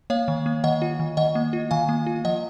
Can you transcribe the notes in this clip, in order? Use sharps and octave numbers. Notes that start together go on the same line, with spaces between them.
A#3 C#5 F5
D#3
A#3
D#3 D#5 F#5
F4
D#3
D#3 D#5 F#5
A#3
F4
D#3 F5 G#5
A#3
F4
F3 D#5 F#5